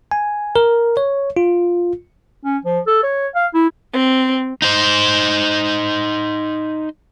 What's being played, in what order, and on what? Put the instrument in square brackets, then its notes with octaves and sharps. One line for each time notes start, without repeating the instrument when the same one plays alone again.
[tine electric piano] G#5
A#4
C#5
F4
[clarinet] C#4
F3
A4
C#5
F5
E4
[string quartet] C4
[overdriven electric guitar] D#4 C5